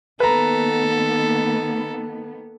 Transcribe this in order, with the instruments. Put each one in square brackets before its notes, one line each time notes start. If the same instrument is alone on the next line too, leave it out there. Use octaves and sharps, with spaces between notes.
[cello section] D#3 A#3 B3 [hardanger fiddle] A4 [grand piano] B4 A#5